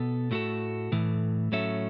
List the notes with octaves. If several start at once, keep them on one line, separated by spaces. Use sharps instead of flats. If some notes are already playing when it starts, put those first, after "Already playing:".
Already playing: B2 B3 A4
A2 A3 F#4 A4
A2 E3 A3
A2 F#3 C#4 A4 E5